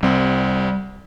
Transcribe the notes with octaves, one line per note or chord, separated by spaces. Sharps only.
C2 G3 C4